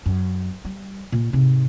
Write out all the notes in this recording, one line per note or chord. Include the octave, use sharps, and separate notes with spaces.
F#2
G3
A#2
G#2 C3